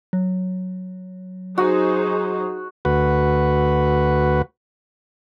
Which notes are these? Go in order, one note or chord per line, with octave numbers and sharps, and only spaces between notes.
F#3
D#4 F#4 G#4 C5
D2 F#4 B4